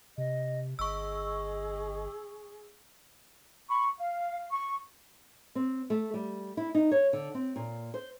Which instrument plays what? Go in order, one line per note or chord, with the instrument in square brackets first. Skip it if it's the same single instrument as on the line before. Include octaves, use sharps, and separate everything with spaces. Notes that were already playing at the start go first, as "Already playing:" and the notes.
[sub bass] C3 [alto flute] D#5
[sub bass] G1 [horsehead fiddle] G#4 [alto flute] D#5 [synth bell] C#6 E6
[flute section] B5 C#6
F5
C#6
[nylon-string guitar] C4
A3
G3
E4
D#4
C#5
D3
C4
A#2
C5